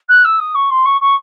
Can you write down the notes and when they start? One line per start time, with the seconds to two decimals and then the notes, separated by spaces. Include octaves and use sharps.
0.09 F#6
0.24 E6
0.39 D#6
0.54 C#6
0.70 C6
0.85 C#6
1.01 C#6